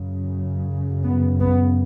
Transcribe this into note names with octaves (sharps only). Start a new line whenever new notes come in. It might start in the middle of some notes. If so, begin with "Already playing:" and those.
Already playing: F#2 C#3
B3
B3